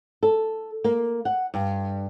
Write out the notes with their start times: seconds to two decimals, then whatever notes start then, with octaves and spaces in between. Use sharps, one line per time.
0.23 A4
0.84 A#3
1.25 F#5
1.54 G2